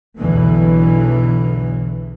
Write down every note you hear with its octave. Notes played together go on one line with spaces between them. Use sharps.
B1 E2 B2 D3 E3 F#3